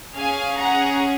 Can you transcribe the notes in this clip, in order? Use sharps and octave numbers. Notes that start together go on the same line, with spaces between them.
C#4 G#4 F5 G#5
F#5 A#5